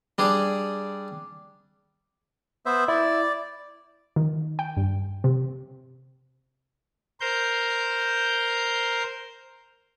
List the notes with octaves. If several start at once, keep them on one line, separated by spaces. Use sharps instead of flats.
G3 D4 G#4
B3 C5 E5
E4 D5
D#3
G5
G2
C3
A#4 C5 G6